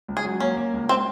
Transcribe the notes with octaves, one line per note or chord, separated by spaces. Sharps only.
C#2
G#4
F#3
A#3 C#4
A#3
C#2
C4